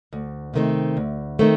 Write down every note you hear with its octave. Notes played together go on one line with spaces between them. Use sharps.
D2
C3 D#3 A3 C4
D2
D#3 A3 C4